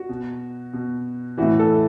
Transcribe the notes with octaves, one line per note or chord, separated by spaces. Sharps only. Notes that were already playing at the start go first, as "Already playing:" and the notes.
Already playing: F#4
B2
B2
A2 E3 F#4
A4